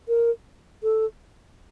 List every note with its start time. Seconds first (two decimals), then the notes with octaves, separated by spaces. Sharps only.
0.08 A#4
0.83 A4